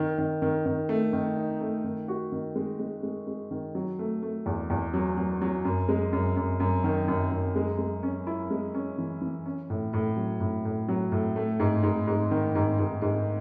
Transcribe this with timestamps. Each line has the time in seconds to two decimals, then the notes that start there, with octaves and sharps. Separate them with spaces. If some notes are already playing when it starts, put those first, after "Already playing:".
Already playing: D#3
0.18 D#3
0.42 D#3
0.66 D#3
0.89 A3
1.13 D#3
1.37 D#4
1.60 A3
1.84 D#3
2.08 F#4
2.32 D#3
2.56 G#3
2.79 G#3
3.03 G#3
3.27 G#3
3.51 D#3
3.75 F#3
3.99 A3
4.22 A3
4.46 E2
4.70 E2
4.94 F#3
5.17 F#3
5.42 F#3
5.65 F#2
5.89 G#3
6.13 F#2
6.37 F#2
6.60 F#2
6.84 D#3
7.08 F#2
7.32 F#2
7.56 G#3
7.79 G#3
8.03 C#4
8.27 E4
8.51 G#3
8.74 C#4
8.98 E3
9.22 E3
9.46 C#4
9.70 A2
9.93 A2
10.17 F#3
10.40 A2
10.65 A2
10.88 F#3
11.12 A2
11.36 A3
11.60 G#2
11.83 G#2
12.07 G#2
12.31 D#3
12.55 G#2
12.79 G#2
13.02 G#2